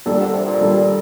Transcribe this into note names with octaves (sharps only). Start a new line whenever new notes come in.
A#2 G3 D4 A4
D3
C3
A#2
G3 D4 A4